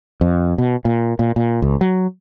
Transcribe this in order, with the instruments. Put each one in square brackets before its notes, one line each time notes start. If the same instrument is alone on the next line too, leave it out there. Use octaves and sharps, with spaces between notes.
[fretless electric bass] F2
B2
A#2
A#2
A#2
C#2
F#3